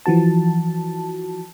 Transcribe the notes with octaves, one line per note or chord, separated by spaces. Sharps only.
E3 F3 F#4 A5